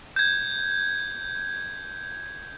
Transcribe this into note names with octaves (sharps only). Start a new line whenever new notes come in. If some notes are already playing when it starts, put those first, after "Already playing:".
G6 G#6